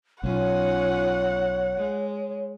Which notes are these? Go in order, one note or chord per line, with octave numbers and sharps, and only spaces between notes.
B1 C#4 D#4 F4 C#5 F#5
G#3